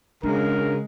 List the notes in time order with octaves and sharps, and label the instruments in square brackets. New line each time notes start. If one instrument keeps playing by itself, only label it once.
[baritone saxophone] C#3 [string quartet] G#3 [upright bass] D4 [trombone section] F#4 A#4